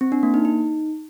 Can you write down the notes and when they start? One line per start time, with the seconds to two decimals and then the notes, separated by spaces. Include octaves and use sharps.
0.01 C4
0.12 D4
0.23 A#3
0.34 D#4
0.45 D#4